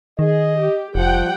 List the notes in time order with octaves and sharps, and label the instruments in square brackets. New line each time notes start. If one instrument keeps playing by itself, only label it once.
[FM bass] D#3 [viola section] G#4 [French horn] D#5
[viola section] G4
[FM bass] F1 [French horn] F3 [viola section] G3 F#5 G5